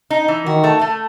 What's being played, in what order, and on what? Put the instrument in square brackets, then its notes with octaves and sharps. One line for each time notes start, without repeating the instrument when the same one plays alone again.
[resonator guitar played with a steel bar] D#4
E3
[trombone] D#3 [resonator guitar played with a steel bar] F#4
[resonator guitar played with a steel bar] A3
A3